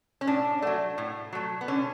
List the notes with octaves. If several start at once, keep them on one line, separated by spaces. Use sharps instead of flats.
C#4
A2 D4
F#3 A3
A2
F#3 A3
B3
D3 C#4